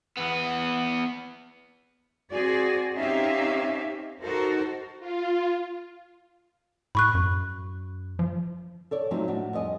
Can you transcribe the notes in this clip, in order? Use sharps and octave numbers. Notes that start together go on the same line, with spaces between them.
E2 B3
C4 F#4 G#4 D5
C4 C#4 D#4 G4 E5 F5
D#4 F#4 A4 A#4 C5
F4
A2 B5 C#6 F#6
F#2
F3
A4 C#5 D5
F3 F#3 A3 C4 D#4
A2 D4 F#4
F2 G3 D#5 G#5